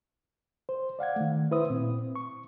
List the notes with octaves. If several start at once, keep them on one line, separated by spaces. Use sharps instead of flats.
C5
D5 F5 F#5 G#6
D#3 A3
E4 B4 C5 E5 D#6
A#2 C4
C#6